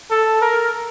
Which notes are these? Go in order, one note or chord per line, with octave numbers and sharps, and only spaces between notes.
A4
A#4